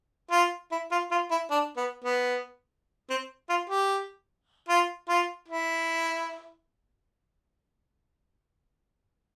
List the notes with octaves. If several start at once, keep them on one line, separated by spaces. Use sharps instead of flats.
F4
E4
F4
F4
E4
D4
B3
B3
C4
F4
G4
F4
F4
E4